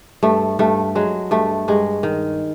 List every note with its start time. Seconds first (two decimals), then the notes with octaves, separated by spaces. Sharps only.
0.23 G2 A3
0.59 G2 A3
0.95 F#3 G#3
1.31 G2 A3
1.68 G2 G#3
2.03 D#3